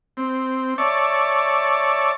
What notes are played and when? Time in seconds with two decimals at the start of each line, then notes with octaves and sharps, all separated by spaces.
0.17 C4
0.78 C#5 D5 E5 A5 C#6